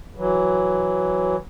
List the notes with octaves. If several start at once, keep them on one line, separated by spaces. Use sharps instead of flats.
E3 F#3